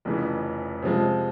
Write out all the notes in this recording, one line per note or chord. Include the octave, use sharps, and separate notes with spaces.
F1 F2 C#3 E3
C3 F3 G#3